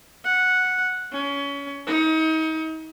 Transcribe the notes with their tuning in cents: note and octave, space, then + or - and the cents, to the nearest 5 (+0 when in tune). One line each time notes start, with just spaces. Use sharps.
F#5 -5
C#4 +25
D#4 +35